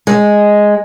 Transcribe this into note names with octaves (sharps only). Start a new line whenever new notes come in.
G#3